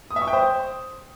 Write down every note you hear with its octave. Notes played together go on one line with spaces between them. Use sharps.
D#6
E5
C#6
G5
C5